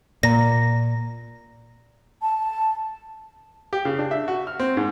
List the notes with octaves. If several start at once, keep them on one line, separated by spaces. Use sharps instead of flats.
A#2 D5 A#5 A#6
A5
G4
C#3
D4
E5
F#4
F6
C4
G#2